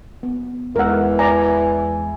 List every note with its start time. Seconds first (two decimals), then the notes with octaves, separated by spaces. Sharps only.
0.23 B3
0.76 E2 E3 G#3 A#4 F#5 E6
1.19 D5 G#5 A#5